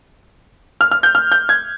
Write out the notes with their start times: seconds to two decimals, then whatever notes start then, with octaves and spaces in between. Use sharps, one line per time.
0.81 F6
0.91 F6
1.03 G6
1.15 F6
1.32 G6
1.49 G#6